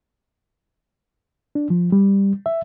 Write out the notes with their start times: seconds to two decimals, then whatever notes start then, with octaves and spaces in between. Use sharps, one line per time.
1.55 D4
1.70 F3
1.92 G3
2.46 E5